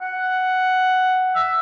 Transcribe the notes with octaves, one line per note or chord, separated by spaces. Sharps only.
F#5
E5